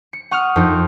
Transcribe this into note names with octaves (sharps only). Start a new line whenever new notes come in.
C#7
F#5 C#6 D#6 F6 F#6
F2 D#4